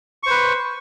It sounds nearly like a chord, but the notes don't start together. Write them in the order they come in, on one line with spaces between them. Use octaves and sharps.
C#6 C5 B4